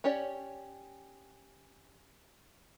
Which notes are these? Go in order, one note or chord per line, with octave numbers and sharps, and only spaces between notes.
C#4 G4 C#5 D5